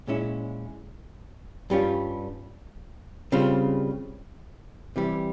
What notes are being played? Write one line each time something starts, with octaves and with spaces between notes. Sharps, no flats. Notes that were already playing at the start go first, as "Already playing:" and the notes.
A#2 G#3 C#4 E4
G2 G3 C#4 F4
C#3 G3 C4 F4
C3 E3 G3